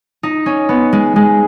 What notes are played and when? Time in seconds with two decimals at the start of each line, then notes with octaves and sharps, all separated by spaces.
0.23 D#4
0.46 C#4
0.69 B3
0.93 G#3
1.16 G#3